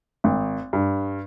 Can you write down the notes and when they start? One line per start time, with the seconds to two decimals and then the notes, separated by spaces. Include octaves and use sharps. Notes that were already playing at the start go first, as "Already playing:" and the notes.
0.24 G#1
0.73 G2